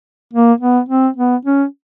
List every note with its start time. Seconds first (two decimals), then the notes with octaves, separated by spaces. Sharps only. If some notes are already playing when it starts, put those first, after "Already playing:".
0.33 A#3
0.60 B3
0.89 C4
1.16 B3
1.45 C#4